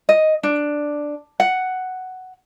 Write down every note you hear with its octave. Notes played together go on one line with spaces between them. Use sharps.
D#5
D4
F#5